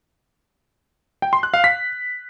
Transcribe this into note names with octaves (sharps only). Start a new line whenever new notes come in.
G5
C6
F#6
F5
B6